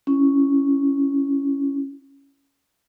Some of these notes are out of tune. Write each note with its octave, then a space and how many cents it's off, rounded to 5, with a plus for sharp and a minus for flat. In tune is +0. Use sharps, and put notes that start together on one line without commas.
C#4 +0 E4 +15